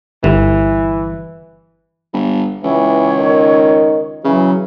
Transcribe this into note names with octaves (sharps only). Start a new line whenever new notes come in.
G1 E3
G1
C#2 E3 C#5
D#3
C#3 E3 F#3